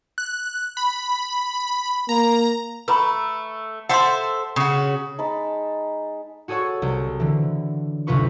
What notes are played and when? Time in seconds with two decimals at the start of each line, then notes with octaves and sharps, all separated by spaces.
0.18 F#6
0.77 B5
2.09 A#3 A#5
2.88 A3 B4 A#5 B5
3.89 A4 C5 E5 F#5 C6
4.56 C#3 F#4
5.18 G#3 D#4 A5 B5
6.48 F#4 G#4 A4 C#5 F#5
6.82 C2
7.20 D3 E3
8.07 F#1 D2 C3 F4 B4 C#6